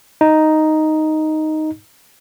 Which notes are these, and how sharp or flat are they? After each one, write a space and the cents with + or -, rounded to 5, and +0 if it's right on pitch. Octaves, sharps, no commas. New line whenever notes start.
D#4 +0